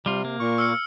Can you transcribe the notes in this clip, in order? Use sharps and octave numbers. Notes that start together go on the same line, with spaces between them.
C3 G3 F4
A#3
A#2 C#6
E6 F6 C#7